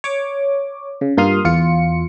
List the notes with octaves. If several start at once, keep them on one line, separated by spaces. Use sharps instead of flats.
C#5 D6
C#3
G2 A#3 F4 C6 D#6 F6
E2 F4 C#7